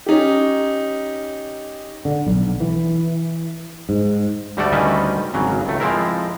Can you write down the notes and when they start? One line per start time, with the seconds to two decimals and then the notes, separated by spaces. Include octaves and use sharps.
0.06 C#4 D#4 G4
2.05 D3
2.26 B1
2.60 E3
3.89 G#2
4.57 D2 G3 A3 F#4 A4 D5
4.72 D2 D#3 G3 C#4 B4 D#5
5.34 G#1 C#3 F#3
5.65 C#2 A3
5.80 F3 G#3 C4 E4 A#4